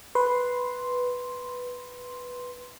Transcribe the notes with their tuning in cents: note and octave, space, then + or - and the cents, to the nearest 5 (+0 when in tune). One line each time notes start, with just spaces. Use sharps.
B4 +0 C6 +0